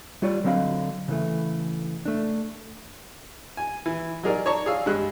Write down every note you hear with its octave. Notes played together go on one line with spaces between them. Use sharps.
G3 F4 C#5 D5
D3 F#3 C4 D#5 F5 B5
C#3 E3 A3
A3 D4
G#5
E3
F#3 D#4 G#4 A#4 D5
C#5 D5 A5 A#5 C#6
G#4 D5 F5 E6
G2 G#3 F#6